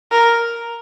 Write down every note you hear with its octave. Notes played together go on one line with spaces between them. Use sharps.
A#4